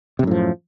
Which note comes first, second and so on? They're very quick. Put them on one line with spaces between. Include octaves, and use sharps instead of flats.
C3 F#2 A2 F3